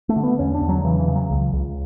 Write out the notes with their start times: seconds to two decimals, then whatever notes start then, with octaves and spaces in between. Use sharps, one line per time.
0.09 A3
0.16 D3
0.23 B3
0.39 E2 C#4
0.54 D4
0.61 E2
0.69 F#3
0.84 C#3 E3
0.99 E3
1.08 C#3
1.15 F#3
1.31 C#2
1.53 C#2